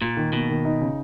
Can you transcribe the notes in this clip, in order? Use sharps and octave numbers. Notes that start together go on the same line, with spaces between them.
A#2 F4
D#3
B2 A#3
D#3
D#4
C#3